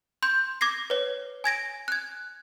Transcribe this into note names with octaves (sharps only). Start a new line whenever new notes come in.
C6 G6
D6 G#6 A#6 C7
B4 C#5
G#5 G#6 A#6 D7
F#6 G#6